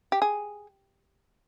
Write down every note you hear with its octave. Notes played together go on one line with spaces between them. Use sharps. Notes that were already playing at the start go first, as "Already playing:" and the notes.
G4
G#4